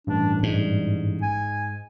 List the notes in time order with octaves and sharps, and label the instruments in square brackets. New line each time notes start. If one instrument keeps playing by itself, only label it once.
[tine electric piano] A1 G2 [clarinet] D4
[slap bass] G#2 [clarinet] G3
[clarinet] G#5